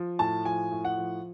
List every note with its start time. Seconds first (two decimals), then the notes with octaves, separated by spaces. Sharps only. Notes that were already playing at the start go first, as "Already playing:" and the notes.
Already playing: F3
0.19 A2 A5
0.45 F3 G#5
0.71 A2
0.85 F#5
0.97 F3